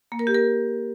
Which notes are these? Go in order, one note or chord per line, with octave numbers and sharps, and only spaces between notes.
A#3
A#4
G4
A#4